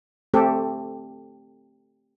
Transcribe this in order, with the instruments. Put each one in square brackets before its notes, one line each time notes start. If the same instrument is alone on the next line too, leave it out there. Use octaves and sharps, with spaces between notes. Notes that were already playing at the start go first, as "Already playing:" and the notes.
[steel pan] A3 C4 G4 A4